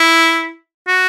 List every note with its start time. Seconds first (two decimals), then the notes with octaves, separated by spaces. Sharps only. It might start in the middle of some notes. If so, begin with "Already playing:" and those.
Already playing: E4
0.88 F#4